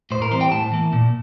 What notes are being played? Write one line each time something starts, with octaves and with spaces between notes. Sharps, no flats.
A2 C5
A#4
E3 G3 C4 C5
G5
A2 A5
E3 A#3
A#2